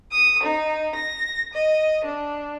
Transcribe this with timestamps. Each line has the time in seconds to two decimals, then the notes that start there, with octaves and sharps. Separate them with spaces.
0.13 D#6
0.43 D#4
0.96 A#6
1.54 D#5
2.04 D4